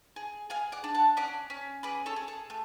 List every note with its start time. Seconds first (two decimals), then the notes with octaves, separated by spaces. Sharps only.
0.16 G#4
0.50 G#4 F5 G#5
0.72 D5 F#5
0.84 D4
0.94 F#5 A5
1.17 C#4 D5 F#5
1.50 C#4
1.83 G#4 B4 D5
2.06 A4 C#5
2.16 G#4
2.28 A4
2.50 A3